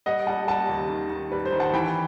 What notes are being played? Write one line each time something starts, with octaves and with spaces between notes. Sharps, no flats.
G3 D#5 F#5
G3 F#5 A5
G3 F#5 A5
D#2
D#3
D#3
G3 B4
C5
D#3
F#5 A5
E3 G5 B5